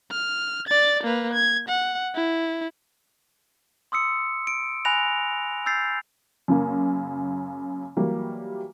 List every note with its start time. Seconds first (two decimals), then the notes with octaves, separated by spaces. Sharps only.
0.11 F6
0.68 D5 A6
1.03 A#3 B4
1.34 G#6
1.69 F#5
2.15 E4
3.92 C6 D#6 E6 C#7
4.47 D7
4.85 G#5 B5 F#6 A#6 F7
5.66 E6 G6 A6 C7
6.48 F#2 C#3 A#3
7.97 E3 F#3 G3 A#3